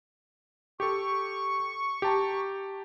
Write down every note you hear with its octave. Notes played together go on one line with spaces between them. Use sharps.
G4 A4 C#6
G4 A5 A#5